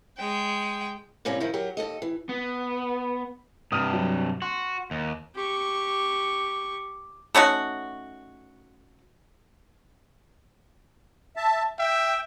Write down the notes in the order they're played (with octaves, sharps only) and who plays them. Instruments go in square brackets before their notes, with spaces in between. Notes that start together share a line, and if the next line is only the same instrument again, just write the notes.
[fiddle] G#3 G5
[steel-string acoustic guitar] A2 C3 G3 A#3 C#4
D#3 F3 E4
F#3 G4 A#4
D#2 A4 D#5
E3
[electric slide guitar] B3
[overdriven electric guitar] G2 C3 [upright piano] D#6 F6 D#7
[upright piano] F#3
[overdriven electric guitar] F#4 [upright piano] C6
[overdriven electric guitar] D#2
[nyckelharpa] G4 C#6
[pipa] A3 C#4 D#4 F#4
[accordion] E5 A5
[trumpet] E5 [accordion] G5